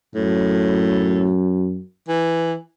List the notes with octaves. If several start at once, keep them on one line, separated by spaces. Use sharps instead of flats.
F#2 A2
E3